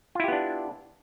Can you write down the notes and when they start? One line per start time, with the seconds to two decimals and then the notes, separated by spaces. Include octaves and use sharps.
0.15 F4
0.20 E4
0.24 G4
0.28 B3
0.32 D4